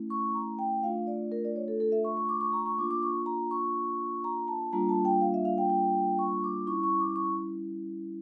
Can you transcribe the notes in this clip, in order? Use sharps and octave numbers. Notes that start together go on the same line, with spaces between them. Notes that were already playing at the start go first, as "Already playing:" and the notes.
Already playing: A3 C#4 E4
C#6
A#5
G5
A3 D4 F4 F5
D5
A#4
D5
C#5
A4
A4
E5
C#6
C#6
D6
C#6
A#5
C#6
A#3 D4 F4 D6
D6
C#6
A#5
C#6
A#5
A5
G3 A#3 D4 F4 A#5
A5
G5
F5
E5
F5
G5
G5
C#6
D6
G3 C#4 E4 C#6
C#6
D6
C#6